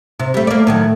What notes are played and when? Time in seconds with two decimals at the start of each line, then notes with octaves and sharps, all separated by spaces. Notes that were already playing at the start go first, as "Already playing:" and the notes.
0.19 C3
0.34 G3 A3
0.47 A3 A#3 D5
0.67 A2 D#3 F#3